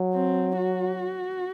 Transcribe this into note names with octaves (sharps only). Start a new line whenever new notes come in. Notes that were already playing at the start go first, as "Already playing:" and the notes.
Already playing: F#3
C4
F#4